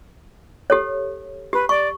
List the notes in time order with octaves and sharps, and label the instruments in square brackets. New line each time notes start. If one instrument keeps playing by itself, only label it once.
[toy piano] G4 A4 C#5
[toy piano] G4 [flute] B4
[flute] D5 [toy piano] C#6